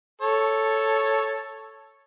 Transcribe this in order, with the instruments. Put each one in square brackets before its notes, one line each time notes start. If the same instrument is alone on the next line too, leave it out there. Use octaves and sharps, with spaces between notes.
[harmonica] A4 C#5